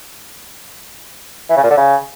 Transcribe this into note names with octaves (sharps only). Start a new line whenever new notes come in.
E3
C#3
A#2
D3
C#3